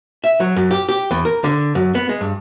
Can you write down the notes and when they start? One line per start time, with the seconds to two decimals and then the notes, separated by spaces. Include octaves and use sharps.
0.24 E5
0.40 F#3
0.56 F#2
0.71 G4
0.89 G4
1.11 E2
1.25 A#4
1.44 D3
1.75 F#2
1.95 B3
2.09 G#3
2.21 G2